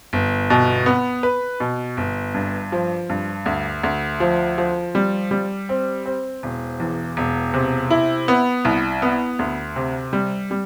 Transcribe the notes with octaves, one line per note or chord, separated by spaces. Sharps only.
G1
B2
B3
B4
B2
G1
G2
F3
G2
D2
D2
F3
F3
G3
G3
C4
C4
E1
E2
E1
C3
E4
B3
C2
B3
D2
C3
G3
G3